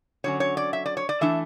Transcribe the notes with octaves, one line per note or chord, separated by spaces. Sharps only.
D3 F#3 C#4 C#5
C#5
D5
E5
D5
C#5
D5
E3 A3 D4 E5